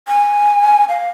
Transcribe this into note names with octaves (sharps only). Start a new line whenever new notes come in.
G#5
F5